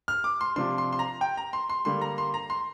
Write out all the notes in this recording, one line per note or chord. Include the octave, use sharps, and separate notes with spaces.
F6
D6
C6
C3 F3 D4 C6
C6
C6
A#5
G5
A#5
C6
C6
D3 G3 A#3 C6
A#5
C6
A#5
C6